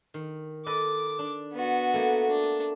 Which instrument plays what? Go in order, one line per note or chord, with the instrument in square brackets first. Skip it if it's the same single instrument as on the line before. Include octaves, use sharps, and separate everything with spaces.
[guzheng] D#3
[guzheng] A4 B4 D#5 [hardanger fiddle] D6
[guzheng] D4
[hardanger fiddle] B3 F#4
[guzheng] A3 A#3
[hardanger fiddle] D4